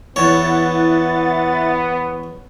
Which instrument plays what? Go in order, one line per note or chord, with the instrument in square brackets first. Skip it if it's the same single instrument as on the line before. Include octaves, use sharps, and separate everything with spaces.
[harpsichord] E2 C#5 [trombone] B3 [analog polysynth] E4 F#5 A6